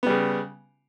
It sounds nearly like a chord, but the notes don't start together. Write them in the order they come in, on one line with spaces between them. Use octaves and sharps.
B3 G3 C#3